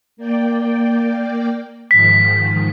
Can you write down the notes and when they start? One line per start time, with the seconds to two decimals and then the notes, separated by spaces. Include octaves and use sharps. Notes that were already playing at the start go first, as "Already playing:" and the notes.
0.17 A#3 D5 G5
1.91 G#2 D#3 F3 B6